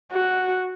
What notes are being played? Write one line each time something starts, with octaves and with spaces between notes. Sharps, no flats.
F#4